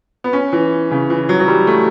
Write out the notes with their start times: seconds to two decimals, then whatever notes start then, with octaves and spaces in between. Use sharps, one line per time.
0.24 B3
0.33 C#4
0.53 E3
0.91 C#3
1.10 E3
1.29 F#3
1.40 F#3
1.48 G3
1.67 A3